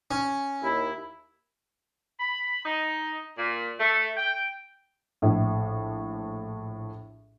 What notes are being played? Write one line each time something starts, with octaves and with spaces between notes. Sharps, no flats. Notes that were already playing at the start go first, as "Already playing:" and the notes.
C#4
D#2 E4
B5
D#4
A#2
A3
G5
A#1 A2